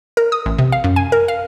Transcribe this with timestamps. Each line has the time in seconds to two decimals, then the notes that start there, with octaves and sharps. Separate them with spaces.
0.17 A#4
0.32 D#6
0.46 A1
0.59 C3
0.72 F5
0.84 F#2
0.96 G#5
1.12 A#4
1.28 F5